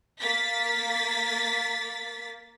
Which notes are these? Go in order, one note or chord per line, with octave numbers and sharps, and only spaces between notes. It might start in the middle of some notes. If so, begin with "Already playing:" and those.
A#3 A6 B6